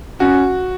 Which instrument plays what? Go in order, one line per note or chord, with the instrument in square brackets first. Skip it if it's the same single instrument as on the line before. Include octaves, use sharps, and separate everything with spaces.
[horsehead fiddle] C#4 [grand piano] F#4